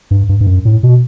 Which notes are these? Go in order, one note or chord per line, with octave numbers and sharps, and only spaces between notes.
G2
G2
G2
F#2
A2
B2